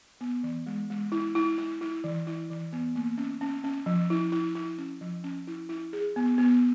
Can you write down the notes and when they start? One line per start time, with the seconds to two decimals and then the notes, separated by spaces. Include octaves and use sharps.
0.21 B3
0.44 E3
0.67 G#3
0.90 G#3
1.12 E4
1.35 E4
1.58 E4
1.81 E4
2.04 E3
2.27 E4
2.50 E3
2.73 B3
2.96 A#3
3.18 C#4
3.41 C#4
3.64 C#4
3.86 F3
4.10 E4
4.32 E4
4.55 E4
4.78 C#4
5.01 F3
5.24 C#4
5.47 E4
5.69 E4
5.93 G#4
6.16 B3
6.38 B3